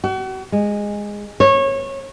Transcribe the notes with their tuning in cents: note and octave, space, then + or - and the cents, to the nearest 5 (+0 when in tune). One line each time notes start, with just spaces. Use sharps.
F#4 +40
G#3 -10
C#5 -25